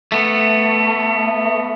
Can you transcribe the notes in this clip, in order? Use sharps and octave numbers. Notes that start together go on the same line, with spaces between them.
A3 B3